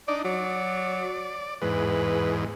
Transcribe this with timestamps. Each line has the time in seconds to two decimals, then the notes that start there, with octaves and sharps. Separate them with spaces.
0.08 D4 D#4 D5
0.25 F#3 D5
1.62 E2 G#2 B4